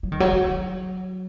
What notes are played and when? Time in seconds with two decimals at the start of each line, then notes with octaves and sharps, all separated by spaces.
0.03 F#3
0.12 D#3
0.20 F#3
0.33 F#3